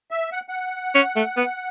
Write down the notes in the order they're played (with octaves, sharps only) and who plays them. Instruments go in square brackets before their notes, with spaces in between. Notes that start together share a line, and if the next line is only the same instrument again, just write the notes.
[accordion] E5
F#5
F#5
[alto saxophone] C#4
A3
B3